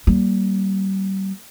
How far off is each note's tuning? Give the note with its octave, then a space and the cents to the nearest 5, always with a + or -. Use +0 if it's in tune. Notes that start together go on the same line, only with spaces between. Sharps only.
G3 -30 A#3 +0